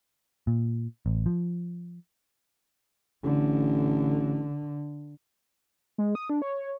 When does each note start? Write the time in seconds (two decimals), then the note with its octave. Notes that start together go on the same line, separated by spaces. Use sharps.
0.47 A#2
1.06 A1
1.26 F3
3.24 A1 D3
5.98 G#3
6.15 D#6
6.30 D4
6.42 C#5